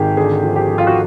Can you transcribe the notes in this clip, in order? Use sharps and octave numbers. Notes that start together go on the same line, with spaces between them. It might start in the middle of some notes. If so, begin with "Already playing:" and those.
Already playing: G#1 D#3 G4 G#4
D3 G#4
F3
G4
F3
F4
F#4